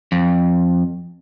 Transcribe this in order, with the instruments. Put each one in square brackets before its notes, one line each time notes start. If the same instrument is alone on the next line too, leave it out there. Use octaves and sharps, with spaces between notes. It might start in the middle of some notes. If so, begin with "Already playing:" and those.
[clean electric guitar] F2